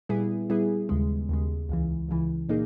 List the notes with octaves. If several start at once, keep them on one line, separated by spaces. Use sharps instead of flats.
A#2 G3 B3 E4 G#4
A#2 G3 B3 E4 G#4
D#2 C#3 G#3
D#2 C#3 G#3
C#2 C#3 E3
C#2 C#3 E3
A#2 A#3 D#4 G#4